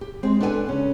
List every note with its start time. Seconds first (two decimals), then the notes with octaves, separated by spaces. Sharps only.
0.01 G4
0.23 G#3 C4
0.40 D4 A4 B4 F#5 G#5
0.68 C#3 C#4